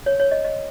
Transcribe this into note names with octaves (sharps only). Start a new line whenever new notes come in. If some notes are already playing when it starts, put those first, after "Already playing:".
C#5
C#5
D#5
D#5